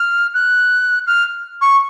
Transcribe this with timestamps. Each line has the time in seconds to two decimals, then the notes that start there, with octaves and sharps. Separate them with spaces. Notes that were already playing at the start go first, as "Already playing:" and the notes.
Already playing: F6
0.34 F#6
1.07 F6
1.61 C#6